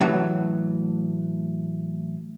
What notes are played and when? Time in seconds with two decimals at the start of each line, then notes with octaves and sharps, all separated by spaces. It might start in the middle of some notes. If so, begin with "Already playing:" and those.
0.01 A2 E3 F#3